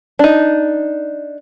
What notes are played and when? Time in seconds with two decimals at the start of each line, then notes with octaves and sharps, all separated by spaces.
0.19 D4 D#4